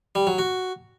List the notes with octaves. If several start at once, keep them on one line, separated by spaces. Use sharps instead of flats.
G3
F#3
F#4